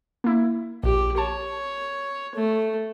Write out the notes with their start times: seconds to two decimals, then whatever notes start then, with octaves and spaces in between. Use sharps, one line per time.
0.24 A#3 E4
0.83 A#1 G4
1.18 C#5 A5
2.35 A3